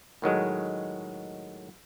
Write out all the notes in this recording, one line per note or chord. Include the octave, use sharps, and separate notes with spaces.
A2 D#3 F#3 G#3